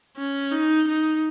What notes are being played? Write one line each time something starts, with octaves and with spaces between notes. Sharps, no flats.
C#4
D#4
D#4